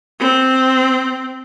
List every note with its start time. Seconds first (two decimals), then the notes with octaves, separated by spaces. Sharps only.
0.20 C4